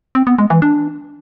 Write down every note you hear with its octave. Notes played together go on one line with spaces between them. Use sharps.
C4
B3
G#3
E3
D4